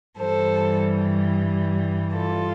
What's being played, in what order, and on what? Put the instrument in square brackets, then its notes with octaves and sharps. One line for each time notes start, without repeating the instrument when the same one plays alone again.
[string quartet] G2 E3 G3 A4 C5
F4 A4